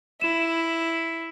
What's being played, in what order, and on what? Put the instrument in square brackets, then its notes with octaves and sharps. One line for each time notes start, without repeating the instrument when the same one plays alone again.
[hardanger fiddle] E4 [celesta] E7